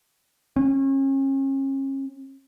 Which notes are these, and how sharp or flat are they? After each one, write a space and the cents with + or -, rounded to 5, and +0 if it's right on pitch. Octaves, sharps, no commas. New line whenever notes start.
C#4 -35